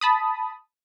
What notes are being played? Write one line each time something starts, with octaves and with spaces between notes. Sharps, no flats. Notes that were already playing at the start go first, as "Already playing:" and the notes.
A5 B5 D#6